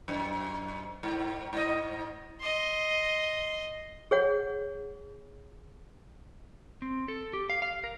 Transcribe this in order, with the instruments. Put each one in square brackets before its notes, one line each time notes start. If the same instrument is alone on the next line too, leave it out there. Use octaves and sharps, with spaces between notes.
[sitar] F#2
G#2
G#2 D#5
[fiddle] D#5 C6
[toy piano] G#4 C#5 F#5
[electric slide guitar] C4
A4
G4
F5
F5
A#4